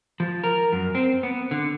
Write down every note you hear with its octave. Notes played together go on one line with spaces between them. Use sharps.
F3
A#4
F#2
C4
B3
D3